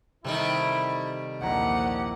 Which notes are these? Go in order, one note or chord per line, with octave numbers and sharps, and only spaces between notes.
C3 D#3 G3 A3 E4
A#1 D#2 D4 E4 G4 D#5 F#5 A#5